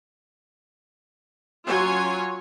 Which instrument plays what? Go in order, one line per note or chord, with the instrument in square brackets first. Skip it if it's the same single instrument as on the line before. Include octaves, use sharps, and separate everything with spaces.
[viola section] F#3 C#4 F4 C#5 G#5